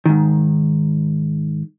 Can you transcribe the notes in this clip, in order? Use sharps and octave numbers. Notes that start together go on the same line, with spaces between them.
G#2 D#3